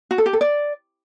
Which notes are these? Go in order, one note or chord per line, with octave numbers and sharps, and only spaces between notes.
F#4
A4
G4
A4
D5